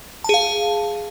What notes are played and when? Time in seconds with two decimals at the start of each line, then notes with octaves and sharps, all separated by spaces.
0.24 A5
0.29 G#4
0.34 F5